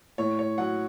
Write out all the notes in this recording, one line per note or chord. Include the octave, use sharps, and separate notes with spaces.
A2 C#5
C#5
F#3 F#5